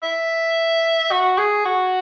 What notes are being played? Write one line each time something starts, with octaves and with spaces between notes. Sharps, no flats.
E5
F#4
G#4
F#4